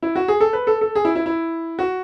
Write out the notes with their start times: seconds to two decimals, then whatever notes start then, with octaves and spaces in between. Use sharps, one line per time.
0.03 E4
0.16 F#4
0.28 G#4
0.41 A4
0.53 B4
0.67 A4
0.81 A4
0.95 G#4
1.05 E4
1.15 E4
1.26 E4
1.79 F#4